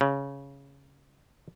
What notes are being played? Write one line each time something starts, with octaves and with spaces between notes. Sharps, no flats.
C#3